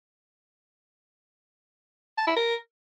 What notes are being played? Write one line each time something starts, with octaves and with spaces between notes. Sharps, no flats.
A5
E4
A#4